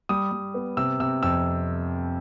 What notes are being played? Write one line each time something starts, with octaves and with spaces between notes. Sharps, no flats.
G3 D#6
G3
B3
C3 E6
C3 E6
F2 E6